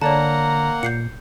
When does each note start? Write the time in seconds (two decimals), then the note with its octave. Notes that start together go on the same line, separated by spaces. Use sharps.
0.02 D3 A#3 C#5 D5 F#5 A5 A#5
0.83 A#2 G6 C7 C#7